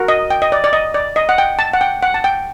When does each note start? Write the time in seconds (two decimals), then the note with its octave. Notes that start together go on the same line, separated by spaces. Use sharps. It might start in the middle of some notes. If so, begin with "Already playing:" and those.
Already playing: F#4 A#4
0.08 D#5
0.30 G5
0.42 D#5
0.52 D5
0.64 D5
0.73 D#5
0.94 D5
1.16 D#5
1.29 F#5
1.38 G5
1.59 A5
1.73 F#5
1.81 G5
2.03 F#5
2.14 A5
2.24 G5